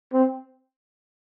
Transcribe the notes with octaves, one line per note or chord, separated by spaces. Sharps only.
C4